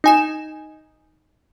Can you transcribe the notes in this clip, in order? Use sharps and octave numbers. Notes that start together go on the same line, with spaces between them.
D#4 G#5 E7